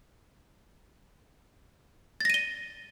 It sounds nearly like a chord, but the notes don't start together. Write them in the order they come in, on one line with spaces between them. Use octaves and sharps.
A6 A#6 D#7 G7